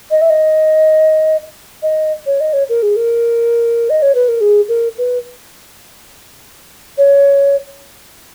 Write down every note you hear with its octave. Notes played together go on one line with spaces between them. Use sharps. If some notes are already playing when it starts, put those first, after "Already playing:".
D#5
E5
D#5
D#5
C#5
D#5
C#5
A#4
G#4
A#4
D#5
C#5
B4
A#4
G#4
A#4
B4
C#5